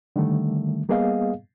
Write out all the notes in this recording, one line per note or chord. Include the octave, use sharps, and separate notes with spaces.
D3 D#3 G3 A3
G3 A#3 B3 G#4 D#5 F5